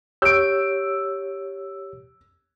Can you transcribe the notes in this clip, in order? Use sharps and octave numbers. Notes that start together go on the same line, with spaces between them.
G4 C#5 E6 G6 D7